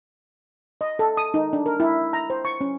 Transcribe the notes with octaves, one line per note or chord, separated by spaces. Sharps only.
D#5
A4
D#6
D#4
D4
A#4
E4
A#5
C5
C#6
C#4